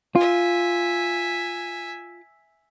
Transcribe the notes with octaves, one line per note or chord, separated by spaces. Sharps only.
F4 E5 G#5